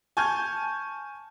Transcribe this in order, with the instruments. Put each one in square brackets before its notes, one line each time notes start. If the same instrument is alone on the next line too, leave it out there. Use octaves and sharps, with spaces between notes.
[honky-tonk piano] G#5 A5 C#6 F6 G6 G#6